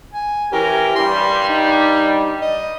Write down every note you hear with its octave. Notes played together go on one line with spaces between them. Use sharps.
G#5
E3 C#4 G4 A#4
G2 G3 C6
D#4
D#5